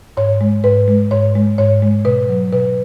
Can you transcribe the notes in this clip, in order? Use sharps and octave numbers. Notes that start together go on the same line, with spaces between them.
G#2 C#5
G#3
G#2 B4
G#3
G#2 C#5
G#3
G#2 C#5
G#3
B2 B4
F#3
B2 B4